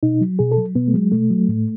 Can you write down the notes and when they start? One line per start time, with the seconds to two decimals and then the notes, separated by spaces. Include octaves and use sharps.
0.03 B2 D#4
0.21 F#3
0.39 B2 G#4
0.52 A4
0.57 F#3
0.75 B2 B3
0.88 A3
0.94 F#3 G#3
1.12 B2 A3
1.31 F#3
1.49 A2